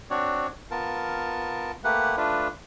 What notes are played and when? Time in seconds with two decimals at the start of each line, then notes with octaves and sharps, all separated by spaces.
0.10 C4 D4 F#4 C#5 D5
0.71 B3 F4 A#4 A5
1.84 A3 A#3 G4 B4 F#5
2.17 A3 D4 F4 B4